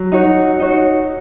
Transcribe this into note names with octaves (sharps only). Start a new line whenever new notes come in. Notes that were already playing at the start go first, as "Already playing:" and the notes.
Already playing: F#3
D#4 F#4 C#5
D#4 F#4 C#5